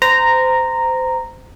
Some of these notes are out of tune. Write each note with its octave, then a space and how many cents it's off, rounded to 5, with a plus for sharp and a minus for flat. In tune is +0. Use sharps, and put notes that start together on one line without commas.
C5 -25 A#5 -5